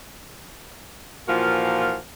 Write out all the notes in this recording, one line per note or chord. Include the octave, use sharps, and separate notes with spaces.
A#2 E3 F3 F4 F#4 A#4